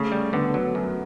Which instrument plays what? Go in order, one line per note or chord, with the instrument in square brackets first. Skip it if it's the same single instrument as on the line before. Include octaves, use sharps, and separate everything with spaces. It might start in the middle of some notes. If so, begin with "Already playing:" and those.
Already playing: [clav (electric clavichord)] C#3 [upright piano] A3
[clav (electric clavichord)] G3
[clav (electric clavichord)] D3 [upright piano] B3
[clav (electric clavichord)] F#3
F#2